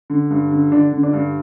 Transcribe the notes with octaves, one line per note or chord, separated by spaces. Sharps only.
D3
G2
D3
D3 D4
D3
D4
G2